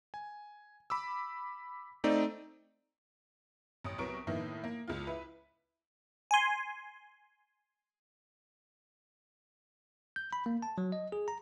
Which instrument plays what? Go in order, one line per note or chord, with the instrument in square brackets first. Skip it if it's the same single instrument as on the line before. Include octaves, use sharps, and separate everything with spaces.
[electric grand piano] G#5
B5 D6 E6
A3 C4 D#4 D5
[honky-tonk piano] A1 D#6
C2 F#3 B3 A#4 C#6 D7
A2 D#3 A#3 B3 D#4 E4
A#3
C#2 F4
E4 B4
[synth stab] G#5 C6
[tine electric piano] G6
B5
A#3
A5
F#3
D#5
G#4
A#5